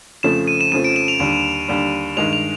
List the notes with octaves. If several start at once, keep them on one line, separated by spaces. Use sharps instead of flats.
F2 C#3 F3 A3 E7
D#7
E7
F2 C#3 F3 A3 D#7
D7
E7
F7
D#2 D3 G3
D#2 D3 G3
G2 D#3 G#3 F7
F7